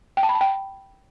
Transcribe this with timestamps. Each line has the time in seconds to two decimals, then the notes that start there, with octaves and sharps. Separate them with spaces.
0.17 G5
0.23 A5
0.29 B5
0.35 A5
0.41 G5